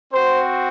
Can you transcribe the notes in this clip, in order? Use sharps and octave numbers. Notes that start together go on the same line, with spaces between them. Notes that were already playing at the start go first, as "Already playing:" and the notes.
C4 F#4 C5